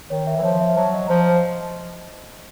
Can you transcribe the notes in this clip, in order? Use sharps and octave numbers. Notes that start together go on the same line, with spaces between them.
D#3 C#5
E5
E3
F3 C#5
E5
F#3 A5
D#5
F3 C5